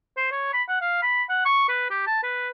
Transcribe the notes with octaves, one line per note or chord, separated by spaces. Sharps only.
C5
C#5
B5
F#5
F5
B5
F#5
C#6
B4
G4
A5
B4